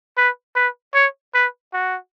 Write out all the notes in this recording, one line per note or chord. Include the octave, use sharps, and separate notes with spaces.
B4
B4
C#5
B4
F#4